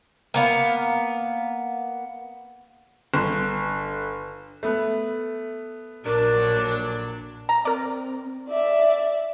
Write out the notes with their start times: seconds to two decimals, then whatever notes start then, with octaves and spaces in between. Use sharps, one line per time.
0.34 A#3 B3 F5
3.14 G1
4.63 A3 B3
6.05 A#1 A#2 F#3 D4 A#4
7.49 A#5
7.65 C4 A#4 D5
8.49 D5 E5